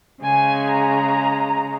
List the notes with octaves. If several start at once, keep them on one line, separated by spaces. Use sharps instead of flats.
C#3 G#3 G#5
A#5